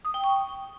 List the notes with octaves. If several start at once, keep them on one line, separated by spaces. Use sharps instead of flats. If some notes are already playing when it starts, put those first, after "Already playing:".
D#6
G5
C#6